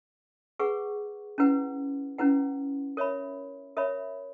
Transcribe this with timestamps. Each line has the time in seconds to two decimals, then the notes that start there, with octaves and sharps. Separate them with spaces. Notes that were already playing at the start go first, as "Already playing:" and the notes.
0.59 G#4 B4 F#5 C#6
1.38 C#4 E4 B4 F#5
2.18 C#4 E4 B4 F#5
2.97 A#4 C#5 E5 B5
3.77 A#4 C#5 E5 B5